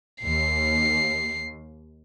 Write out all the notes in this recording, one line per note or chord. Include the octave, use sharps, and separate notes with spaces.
D#2 C7